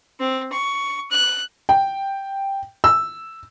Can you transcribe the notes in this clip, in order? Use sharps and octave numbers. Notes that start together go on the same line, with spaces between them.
C4
C#6
F#6
G5
E6